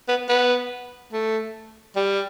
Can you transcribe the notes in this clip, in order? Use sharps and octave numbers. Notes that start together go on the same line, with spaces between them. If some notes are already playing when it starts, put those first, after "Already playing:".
B3
B3
A3
G3